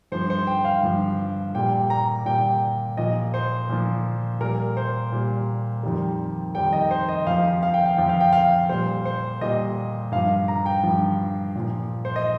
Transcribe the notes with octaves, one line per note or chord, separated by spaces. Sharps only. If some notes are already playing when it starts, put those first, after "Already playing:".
G2 F3 C5
C5
G5
F5
G2 F3
A#2 G3 G5
A#5
A#2 G3 G5
A#2 F3 D#5
C5
A#2 F3
A#2 G3 A#4
C5
A#2 G3
F2 D#3 G3
F2 D#3 G3 G5
D#5
C5
D#5
F2 F3 F5
F5
G5
F5
F2 F3 G5
F5
G5
F5
A#2 G3 C5
C5
A#2 G3 D#5
G2 F3 F5
A#5
G5
G2 F3
A#2 F3
C5
D#5